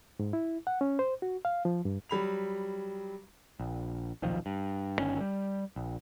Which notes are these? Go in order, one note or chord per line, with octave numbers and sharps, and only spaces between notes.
G#2
E4
F#5
C#4
C5
F#4
F5
F3
G2
F#3 G3 B5 F7
A#1
D#1 B1 D#3 F3
G2
G1 D#3 C#4
G3
A#1